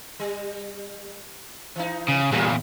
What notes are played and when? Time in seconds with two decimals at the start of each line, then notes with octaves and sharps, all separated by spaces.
0.20 G3
1.76 E3 D#4
2.08 C#3
2.32 E2 A#2 F#3 F4 A#4